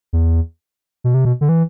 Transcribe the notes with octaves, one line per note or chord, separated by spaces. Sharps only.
E2
B2
C3
B2
D3
E3